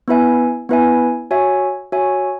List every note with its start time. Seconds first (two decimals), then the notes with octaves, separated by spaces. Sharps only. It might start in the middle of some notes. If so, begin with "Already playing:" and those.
0.08 B3 E4 B4 E5 G#5
0.69 B3 E4 B4 E5 G#5
1.31 F#4 C#5 E5 G#5
1.92 F#4 C#5 E5 G#5